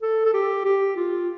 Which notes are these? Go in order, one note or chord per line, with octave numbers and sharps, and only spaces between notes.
A4
A4
G4
G4
F4